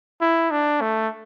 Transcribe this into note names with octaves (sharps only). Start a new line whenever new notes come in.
E4
D4
A3